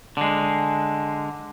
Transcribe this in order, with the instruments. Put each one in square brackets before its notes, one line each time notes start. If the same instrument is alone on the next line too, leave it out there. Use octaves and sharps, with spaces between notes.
[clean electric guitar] D3 G#3